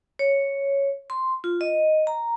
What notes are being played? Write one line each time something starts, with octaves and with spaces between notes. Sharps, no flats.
C#5
C6
F4
D#5
A#5